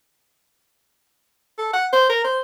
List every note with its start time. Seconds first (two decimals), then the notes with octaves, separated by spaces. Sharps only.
1.58 A4
1.73 F#5
1.93 C5
2.09 A#4
2.24 C5